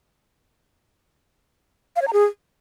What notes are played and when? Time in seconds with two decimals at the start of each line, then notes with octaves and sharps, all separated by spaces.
1.96 F5
2.02 C#5
2.07 A#5
2.13 G#4